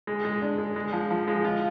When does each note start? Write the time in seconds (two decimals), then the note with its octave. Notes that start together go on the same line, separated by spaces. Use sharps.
0.07 G#3
0.25 G#3
0.42 D4
0.58 G#3
0.76 G#3
0.93 F3
1.11 F3
1.28 G#3
1.44 F4